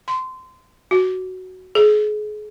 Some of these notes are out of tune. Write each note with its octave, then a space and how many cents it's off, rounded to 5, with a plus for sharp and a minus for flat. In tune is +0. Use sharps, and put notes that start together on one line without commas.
C6 -20
F#4 +5
G#4 +30